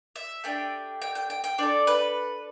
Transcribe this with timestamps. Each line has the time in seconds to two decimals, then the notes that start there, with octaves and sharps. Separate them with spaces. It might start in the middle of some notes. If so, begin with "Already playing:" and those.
0.16 E5
0.44 A3 D4 G4 G5
1.02 G5
1.15 G5
1.30 G5
1.44 G5
1.58 D4 A4 D5
1.87 B4